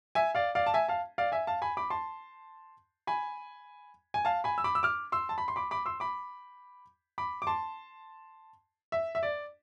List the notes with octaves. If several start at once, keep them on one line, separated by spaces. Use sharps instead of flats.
E5 G#5
D5 F5
D5 F5
A5
E5 G#5
F5 A5
D5 F5
E5 G#5
F5 A5
G#5 B5
B5 D6
A5 C6
G#5 B5
G#5
F5 A5
G#5 B5
E6
B5 D6
E6
D6 F6
C6 E6
A5
B5
C6
B5 D6
B5 D6
C6 E6
B5 D6
B5 D6
D6
A5 C6
E5
E5
D5